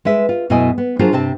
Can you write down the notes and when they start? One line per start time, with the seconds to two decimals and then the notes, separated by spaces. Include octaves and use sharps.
0.05 G#3 B4 E5
0.29 F4
0.50 F#2 B2 A3 E4 D#5 G#5
0.78 B3
0.99 F#3 D4 F4 G#4 A#4 C5
1.12 G2 C3 C4 A5